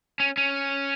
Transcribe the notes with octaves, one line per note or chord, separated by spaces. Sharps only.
C#4
C#4